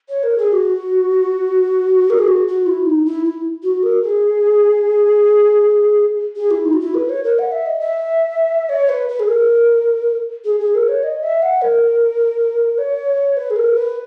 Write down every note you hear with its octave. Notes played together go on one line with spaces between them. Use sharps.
C#5
A#4
G#4
F#4
A#4
G#4
F#4
F#4
E4
D#4
E4
E4
F#4
A#4
G#4
G#4
E4
D#4
F#4
E4
B4
C#5
A#4
F#5
E5
D#5
E5
C#5
B4
B4
G#4
A#4
G#4
G#4
A#4
C#5
D#5
E5
F#5
A#4
C#5
B4
G#4
A#4
B4